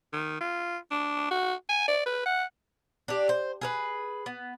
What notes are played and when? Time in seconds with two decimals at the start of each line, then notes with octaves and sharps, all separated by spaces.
0.13 D#3
0.41 F4
0.91 D4
1.31 F#4
1.69 G#5
1.88 D5
2.06 B4
2.26 F#5
3.08 D4 G4
3.29 C5
3.61 G#4 A#4 B4
4.26 B3